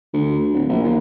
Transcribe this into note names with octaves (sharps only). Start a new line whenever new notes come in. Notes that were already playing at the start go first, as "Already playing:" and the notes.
D2
D1
A#1
D#2